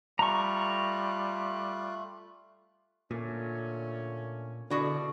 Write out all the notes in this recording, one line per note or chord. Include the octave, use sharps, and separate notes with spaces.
G3 A3 F4 A#5 C#6 F#6
A#2 D3 A3 C#4
B2 D3 E4 F#4 G#4 D5